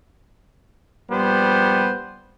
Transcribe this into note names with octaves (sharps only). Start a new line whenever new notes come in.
A#1 G3 B3 C5